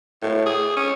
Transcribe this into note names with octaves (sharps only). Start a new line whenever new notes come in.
A2
G#4
C#4